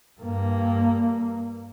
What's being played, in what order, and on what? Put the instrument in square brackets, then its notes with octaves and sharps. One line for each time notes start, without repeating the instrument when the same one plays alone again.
[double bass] G2 A#3